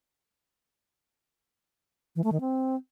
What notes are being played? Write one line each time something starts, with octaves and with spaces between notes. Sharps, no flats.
E3
A3
D#3
C4